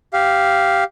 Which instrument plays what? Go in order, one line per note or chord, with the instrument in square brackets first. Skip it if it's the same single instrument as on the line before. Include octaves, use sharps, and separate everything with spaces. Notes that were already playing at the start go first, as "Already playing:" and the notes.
[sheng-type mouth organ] G4 F5